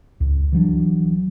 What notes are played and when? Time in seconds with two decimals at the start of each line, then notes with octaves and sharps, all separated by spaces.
0.20 C#2
0.52 E3 F#3 D4